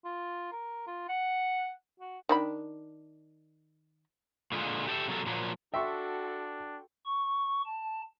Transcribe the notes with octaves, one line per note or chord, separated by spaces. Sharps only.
F4
A#4
F4
F#5
F#4
D#3 D4 B5
A#2 D3 G#3 F4
G4 A4 D5 E5
C3 F#3 A#3 A4 A#4
A#2 F3 F#3 A#3
D4 F#4 A4 E5 G5 C6 C#6
C#6
A5